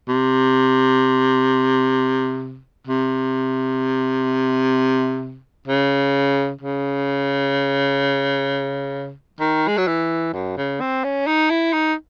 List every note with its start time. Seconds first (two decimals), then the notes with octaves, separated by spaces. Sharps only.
0.09 C3
2.88 C3
5.68 C#3
6.61 C#3
9.40 D#3
9.68 G#3
9.78 F#3
9.88 E3
10.33 F#2
10.57 C#3
10.81 C4
11.04 C#4
11.27 D#4
11.50 E4
11.73 D#4